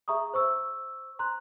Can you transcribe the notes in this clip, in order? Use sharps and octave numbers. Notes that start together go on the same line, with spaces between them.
G#4 E5 A#5 C#6 D#6
C5 C#6 E6
A#5 C6 F#6